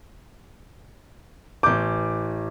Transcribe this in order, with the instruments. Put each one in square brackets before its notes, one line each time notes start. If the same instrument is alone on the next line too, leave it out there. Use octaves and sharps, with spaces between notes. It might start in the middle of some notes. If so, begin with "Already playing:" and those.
[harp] A1 G6 [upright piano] D6